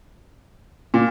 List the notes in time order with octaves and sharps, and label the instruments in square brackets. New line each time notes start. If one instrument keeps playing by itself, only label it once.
[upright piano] A#2